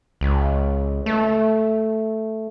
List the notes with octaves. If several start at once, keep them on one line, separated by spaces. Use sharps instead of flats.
C#2
A3